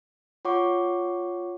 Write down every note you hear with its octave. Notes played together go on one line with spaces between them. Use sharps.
F4 C#5 F#5 C#6 D6